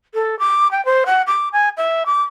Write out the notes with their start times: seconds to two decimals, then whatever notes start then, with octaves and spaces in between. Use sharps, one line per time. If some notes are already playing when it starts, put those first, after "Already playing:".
0.14 A4
0.39 D6
0.71 G5
0.85 C5
1.06 F#5
1.27 D6
1.53 G#5
1.77 E5
2.06 D6